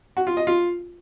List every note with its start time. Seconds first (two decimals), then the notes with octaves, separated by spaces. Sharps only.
0.17 F#4
0.27 F4
0.37 D#5
0.47 F4